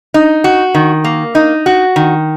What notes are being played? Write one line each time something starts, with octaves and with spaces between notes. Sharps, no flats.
D#4
F#4
D#3
A#3
D#4
F#4
D#3